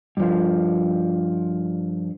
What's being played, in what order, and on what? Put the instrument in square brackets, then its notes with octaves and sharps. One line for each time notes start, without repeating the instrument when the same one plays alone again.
[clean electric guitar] G2 F3